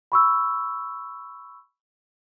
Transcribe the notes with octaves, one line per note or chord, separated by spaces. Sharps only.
B5 C#6 E6